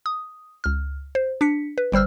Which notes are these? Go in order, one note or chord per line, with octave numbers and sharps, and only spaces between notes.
D#6
C#2 F6
C5
D4 B6 C#7
B4
G1 G3 C5 E6 F6